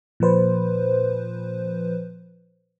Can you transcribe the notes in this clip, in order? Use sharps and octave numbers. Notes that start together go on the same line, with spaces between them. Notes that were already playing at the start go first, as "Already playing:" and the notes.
A#2 F3 B4 C5